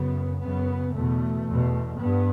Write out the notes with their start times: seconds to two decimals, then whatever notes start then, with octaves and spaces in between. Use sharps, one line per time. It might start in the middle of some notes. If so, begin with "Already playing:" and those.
Already playing: F#2 C#3 B3
0.40 F#2 C#3 B3
0.93 E2 B2 A3
1.48 E2 B2
2.01 G2 B3